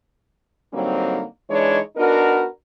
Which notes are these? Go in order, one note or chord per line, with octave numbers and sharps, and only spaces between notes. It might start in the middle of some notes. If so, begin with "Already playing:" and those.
D3 F#3 G3 A#3 C4 D#4
E3 G#3 D4 D#4 C#5
B3 D4 D#4 F#4 A#4